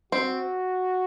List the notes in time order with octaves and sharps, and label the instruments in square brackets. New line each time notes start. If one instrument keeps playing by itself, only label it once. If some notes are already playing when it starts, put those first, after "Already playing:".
[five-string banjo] C4 [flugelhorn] F#4